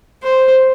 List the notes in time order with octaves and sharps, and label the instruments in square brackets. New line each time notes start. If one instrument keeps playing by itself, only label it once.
[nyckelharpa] C5